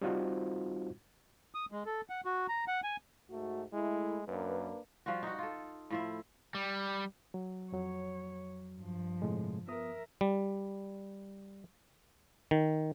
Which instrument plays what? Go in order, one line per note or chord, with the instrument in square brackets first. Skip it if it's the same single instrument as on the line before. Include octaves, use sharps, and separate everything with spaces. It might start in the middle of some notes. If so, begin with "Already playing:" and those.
[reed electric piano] G3 C4 D#4 F4 F#4 C5
[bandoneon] D#6
G#3
A4
F#5
F#4
A#5
F#5
G#5
[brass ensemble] G#2 A3 F#4
[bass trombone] G#3 [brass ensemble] A3 E4
[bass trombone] F#2 [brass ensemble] A#3 D4 B4
[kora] F3 G3 F4 F#4
D#4 F#4
F4 A4
A2 F3 E4
[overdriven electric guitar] G3
[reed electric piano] F#3
[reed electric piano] F2 F#3 [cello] C#5
[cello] G2 F3
[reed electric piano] A2 C3 G#3
[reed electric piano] F3 B3 D#6 [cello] A#4 E5
[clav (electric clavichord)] G3
D#3